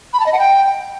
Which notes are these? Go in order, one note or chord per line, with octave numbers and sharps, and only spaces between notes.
B5
A5
D#5
F#5
G5